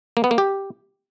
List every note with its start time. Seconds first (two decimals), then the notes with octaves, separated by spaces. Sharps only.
0.17 A#3
0.24 B3
0.31 A#3
0.38 G4